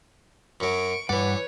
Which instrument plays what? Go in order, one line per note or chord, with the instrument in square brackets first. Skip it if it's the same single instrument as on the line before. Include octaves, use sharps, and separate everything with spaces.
[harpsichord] F#2 F#3 [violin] C#6 D7
[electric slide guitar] G2 F#5 [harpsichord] E3 D5 [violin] B4 C#5